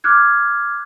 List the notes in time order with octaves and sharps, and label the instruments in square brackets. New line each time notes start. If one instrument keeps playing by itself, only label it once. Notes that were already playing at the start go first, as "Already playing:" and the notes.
[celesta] D6 F6 F#6 G#6